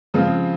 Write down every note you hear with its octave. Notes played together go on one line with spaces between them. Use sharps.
C#3 F3 G#3 C4 F4